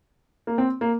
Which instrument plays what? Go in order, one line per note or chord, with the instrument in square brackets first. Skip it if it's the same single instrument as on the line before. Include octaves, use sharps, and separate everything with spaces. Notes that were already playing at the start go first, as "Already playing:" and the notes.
[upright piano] A#3
C4
A#3